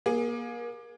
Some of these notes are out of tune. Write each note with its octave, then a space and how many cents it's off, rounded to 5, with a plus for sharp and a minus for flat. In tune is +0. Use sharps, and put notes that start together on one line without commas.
A#3 +30 G#4 +0